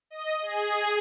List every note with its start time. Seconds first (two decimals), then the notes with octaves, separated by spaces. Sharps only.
0.10 D#5
0.42 G#4